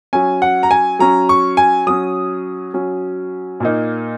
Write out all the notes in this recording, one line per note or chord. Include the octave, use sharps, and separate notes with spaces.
F#3 C#4 G#5
F#5
A#5
G#5
F#3 C#4 A#5
C#6
G#5
F#3 C#4 D#6
F#3 C#4
A#2 A#3 D#4